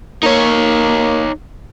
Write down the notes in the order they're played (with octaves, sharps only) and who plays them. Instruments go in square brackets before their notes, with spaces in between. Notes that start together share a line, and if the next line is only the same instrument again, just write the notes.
[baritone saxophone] A#3 [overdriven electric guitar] D#4 C#5